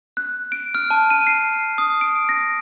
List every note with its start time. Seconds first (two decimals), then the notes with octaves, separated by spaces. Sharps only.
0.17 F#6
0.52 D7
0.75 F6
0.91 A5
1.10 D#7
1.27 C7
1.78 D#6
2.01 D7
2.29 A#6